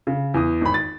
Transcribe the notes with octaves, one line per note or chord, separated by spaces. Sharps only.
C#3
E2 D#6
G#1 B5
A6